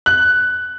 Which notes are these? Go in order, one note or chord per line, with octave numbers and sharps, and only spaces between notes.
F#6